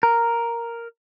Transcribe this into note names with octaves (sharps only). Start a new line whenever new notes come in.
A#4